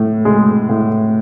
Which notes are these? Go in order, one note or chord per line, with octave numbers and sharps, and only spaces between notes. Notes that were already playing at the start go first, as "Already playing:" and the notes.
Already playing: A2
G#3
A2